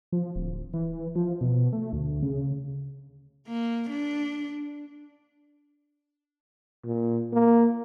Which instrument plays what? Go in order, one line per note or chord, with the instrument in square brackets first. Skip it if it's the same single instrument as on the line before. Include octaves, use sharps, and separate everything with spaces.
[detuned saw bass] F3
D1
E3
F3
B2
A3
D2
C#3
[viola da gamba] A#3
D4
[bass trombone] A#2
A#3